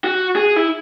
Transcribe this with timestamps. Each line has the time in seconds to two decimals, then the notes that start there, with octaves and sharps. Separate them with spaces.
0.04 F#4
0.36 G#4
0.56 E4